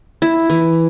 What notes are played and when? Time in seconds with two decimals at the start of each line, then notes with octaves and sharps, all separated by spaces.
0.22 E4
0.50 E3